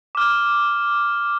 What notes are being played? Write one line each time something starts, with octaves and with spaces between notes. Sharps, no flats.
D6 F6